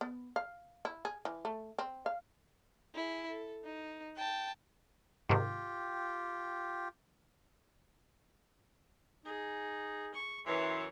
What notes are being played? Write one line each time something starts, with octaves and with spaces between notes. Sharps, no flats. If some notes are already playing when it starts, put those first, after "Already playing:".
B3
F5
E4
G#4
E3
A3
C4
F5
E4 G#4
A4
D#4
G5 A5
G#2 C3 D#3 F4 G4 G5
D#4 G#4
C#6
F#2 E3 C#5 C6